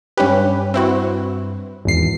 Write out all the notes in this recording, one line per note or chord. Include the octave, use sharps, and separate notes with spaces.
G2 C#4 G4 B4
C4 E4 F#4
G#1 E2 C7